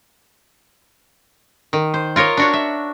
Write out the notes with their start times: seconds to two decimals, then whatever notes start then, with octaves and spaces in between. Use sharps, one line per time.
1.73 D#3
1.94 C5
2.16 F4 A#4 C#5 D#5
2.37 D4 F#4 C#5
2.53 E5